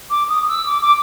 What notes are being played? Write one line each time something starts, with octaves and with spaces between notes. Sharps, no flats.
D6
D#6
E6
D6
D6